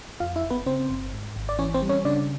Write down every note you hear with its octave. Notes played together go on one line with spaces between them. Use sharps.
F2 F4 F5
E4 E5
G1
B3 B4
C#3 C4 C5
G1
G#2
G#1
D5
E3 C#4 C#5
C4 C5
G3
C#4 C#5
C#3 D4 D5